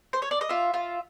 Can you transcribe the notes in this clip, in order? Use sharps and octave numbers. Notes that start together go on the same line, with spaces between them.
C5
C#5
D5
D#5
F4 E5
F4